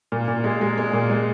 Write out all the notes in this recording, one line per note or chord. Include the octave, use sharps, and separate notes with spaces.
A#2
A#2
G#3
G#3
G#3
A#2
G#3